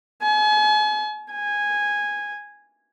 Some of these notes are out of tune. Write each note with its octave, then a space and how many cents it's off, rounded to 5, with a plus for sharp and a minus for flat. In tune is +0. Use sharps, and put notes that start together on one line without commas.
G#5 +40
G#5 -10